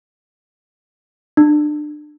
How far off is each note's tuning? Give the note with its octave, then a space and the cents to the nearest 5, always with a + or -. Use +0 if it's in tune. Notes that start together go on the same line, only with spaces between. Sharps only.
D4 +30